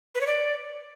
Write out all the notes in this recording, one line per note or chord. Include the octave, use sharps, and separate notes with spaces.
B4
C#5
D5